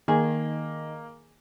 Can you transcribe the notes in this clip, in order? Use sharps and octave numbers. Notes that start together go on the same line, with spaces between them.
D#3 A#3 G#4